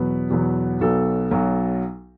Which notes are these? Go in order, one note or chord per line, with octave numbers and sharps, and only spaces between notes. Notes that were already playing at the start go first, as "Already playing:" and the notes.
Already playing: E2 B2 F#3 B4
E2 B2 F#3
B1 B2 F#3 A4
B1 B2 F#3